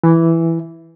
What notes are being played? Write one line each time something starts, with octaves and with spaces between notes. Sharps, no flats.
E3